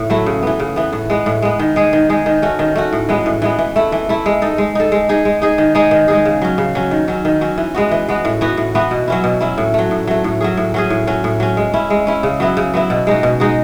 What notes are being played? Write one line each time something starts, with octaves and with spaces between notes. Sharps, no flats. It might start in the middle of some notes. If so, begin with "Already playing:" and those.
Already playing: A2
F#3 A3 E4
C#3
E3 B3
C#3
E3 B3
A2
G#3 B3
A2
G#3 B3
D#3
G#3 D#4 G#4
D#3
G#3 D#4 G#4
D#3
A3 C#4 F#4
D#3
A3 C#4 F#4
A2
E3 G#3 B3
A2
E3 G#3 B3
E3
A3 E4
E3
A3 E4
G#3
D#4 A4
G#3
D#4 A4
G#3
D#4 G#4
G#3
D#4 G#4
D#3
G#3 D#4 G#4
D#3
G#3 D#4 G#4
C#3
F#3 C#4
C#3
F#3 C#4
D#3
F#3 C#4
D#3
F#3 C#4
E3
G#3 B3 F#4
E3
G#3 B3 F#4
A2
E3 B3 F#4
A2
E3 B3 F#4
B2
F#3 C#4 E4
B2
F#3 C#4 E4
A2
F#3 A3
A2
F#3 A3
A2
F#3 C#4 G#4
A2
F#3 C#4 G#4
A2
F#3 C#4
A2
F#3 C#4
G#3
C#4 E4
G#3
C#4 E4
C#3
F#3 B3 E4
C#3
F#3 B3 E4
B2
G#3 D#4 F#4
B2
G#3 D#4 F#4